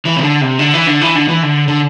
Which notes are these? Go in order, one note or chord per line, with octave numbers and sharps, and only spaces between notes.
E3
C3
D3
C3
D3
E3
D3
E3
D3
E3
D3
D3